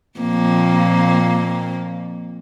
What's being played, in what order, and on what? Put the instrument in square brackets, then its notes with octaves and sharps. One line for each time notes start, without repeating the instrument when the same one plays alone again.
[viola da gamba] F2 A#2 A#3